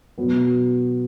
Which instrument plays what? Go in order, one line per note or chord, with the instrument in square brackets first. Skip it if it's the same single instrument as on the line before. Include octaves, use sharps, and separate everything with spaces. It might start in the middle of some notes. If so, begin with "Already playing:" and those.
[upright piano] B2 F#3 B3